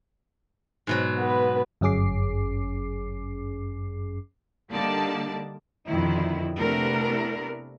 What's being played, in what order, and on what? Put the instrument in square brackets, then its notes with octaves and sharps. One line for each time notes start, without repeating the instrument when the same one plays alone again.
[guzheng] G#2 B2 F#3
[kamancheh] B3 B4
[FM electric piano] G1 F#2 C#4 G#4 D6 C7
[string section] D3 G3 A#3 D#4 D5 A5
[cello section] F2 B2 D3 D#3 D#4 E4
C3 A3 B3 D4 E4 A#4